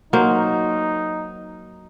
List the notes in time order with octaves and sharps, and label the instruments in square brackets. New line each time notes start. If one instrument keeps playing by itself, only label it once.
[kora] F#3 A#3 C5 [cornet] D#4